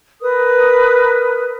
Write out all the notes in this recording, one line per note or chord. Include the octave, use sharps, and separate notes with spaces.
A#4 B4 D#6